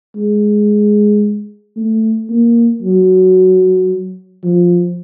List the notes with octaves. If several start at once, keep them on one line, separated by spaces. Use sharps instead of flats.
G#3
A3
A#3
F#3
F3